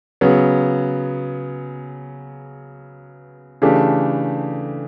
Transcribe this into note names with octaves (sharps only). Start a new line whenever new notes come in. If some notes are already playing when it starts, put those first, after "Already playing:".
C#3 F#3 B3
C#3 E3 A3 D4 G4